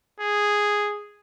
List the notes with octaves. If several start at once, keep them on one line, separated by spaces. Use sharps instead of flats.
G#4